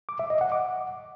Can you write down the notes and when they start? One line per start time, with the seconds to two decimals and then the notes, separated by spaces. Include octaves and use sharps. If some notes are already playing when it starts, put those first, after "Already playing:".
0.09 D6
0.19 E5
0.30 D#5
0.41 F#5
0.52 D6